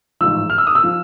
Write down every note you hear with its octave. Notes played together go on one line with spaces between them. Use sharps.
A1 G#2 F3 E6
F6
E6
D#6
E6
F3